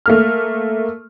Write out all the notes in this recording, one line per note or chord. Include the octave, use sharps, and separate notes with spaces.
A3 A#3 F6